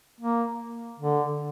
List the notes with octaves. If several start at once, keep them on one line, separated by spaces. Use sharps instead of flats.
A#3
D3